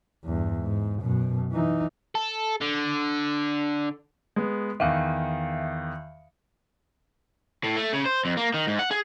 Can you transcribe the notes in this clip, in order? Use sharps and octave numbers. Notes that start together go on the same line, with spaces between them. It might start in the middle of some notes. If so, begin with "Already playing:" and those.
E2 G2
G#2
F#2 B2
E3 D#4
A4
D3
G#3 B3
E2 D#3 E5 F5
A2
A3
C#3
C5
F2
A#3
D#3
G#2
F#5
G#4